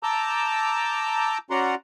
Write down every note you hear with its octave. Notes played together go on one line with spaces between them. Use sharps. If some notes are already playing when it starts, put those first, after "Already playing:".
A5 A#5 D6 E6 G6
C#4 F#4 D5 F#5 A#5 C6